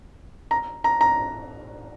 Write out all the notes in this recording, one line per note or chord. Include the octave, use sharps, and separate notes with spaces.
A#5
A#5
A#5